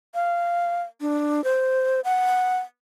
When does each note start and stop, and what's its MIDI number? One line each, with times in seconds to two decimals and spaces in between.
0.15 0.83 77
1.01 1.44 62
1.44 2.00 72
2.04 2.58 78